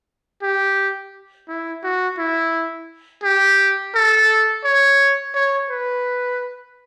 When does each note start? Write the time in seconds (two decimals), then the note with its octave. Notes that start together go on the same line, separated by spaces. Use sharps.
0.42 G4
1.48 E4
1.84 F#4
2.18 E4
3.23 G4
3.95 A4
4.65 C#5
5.35 C#5
5.70 B4